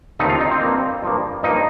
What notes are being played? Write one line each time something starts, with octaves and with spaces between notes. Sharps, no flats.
D#2 D3 A3 C4 D#4 D#5
F4 F5
D#4 D#5
C4 C5
G2 F3 A#3
G2 F3 A#3
G2 F3 A#3 D#4 D#5